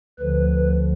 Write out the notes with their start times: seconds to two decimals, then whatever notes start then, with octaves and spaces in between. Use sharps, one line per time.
0.19 D2 D3 F3 B4